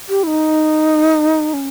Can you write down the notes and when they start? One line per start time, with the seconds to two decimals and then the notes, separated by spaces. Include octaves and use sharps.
0.09 G4
0.23 E4
0.27 D#4
1.53 C#4